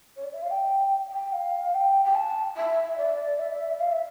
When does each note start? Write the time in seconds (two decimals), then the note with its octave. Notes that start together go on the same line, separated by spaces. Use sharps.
0.16 C#5
0.24 D5
0.33 E5
0.42 F5
0.51 G5
1.12 G5
1.33 F5
1.74 G5
2.04 G5
2.15 A5
2.57 E5
2.98 D5
3.39 E5
3.80 F5
3.92 E5